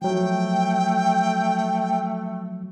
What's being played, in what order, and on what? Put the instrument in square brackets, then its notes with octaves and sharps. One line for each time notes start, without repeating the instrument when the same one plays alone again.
[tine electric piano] F3 F#3 [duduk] A3 [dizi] G5